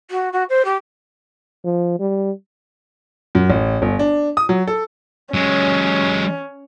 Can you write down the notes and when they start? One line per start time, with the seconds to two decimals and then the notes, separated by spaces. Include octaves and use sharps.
0.10 F#4
0.32 F#4
0.49 C5
0.64 G4
1.64 F3
2.00 G3
3.35 F#2
3.50 A1
3.82 G1
3.99 D4
4.37 D#6
4.49 F#3
4.68 A4
5.34 F#3 G#3 C#4